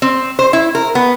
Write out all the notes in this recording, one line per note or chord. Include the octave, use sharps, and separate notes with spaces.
C4
C5
E4
A#4
B3